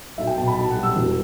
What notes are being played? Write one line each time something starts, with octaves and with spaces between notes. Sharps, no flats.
B1 E5
G5
B2 A5
B5
B1 A5
F#5
G3
E6
E1